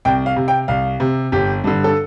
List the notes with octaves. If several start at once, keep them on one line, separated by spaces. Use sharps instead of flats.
C2 G5
F5
C3
G5
C2 F5
C3
G1 G4
G2 D3
A4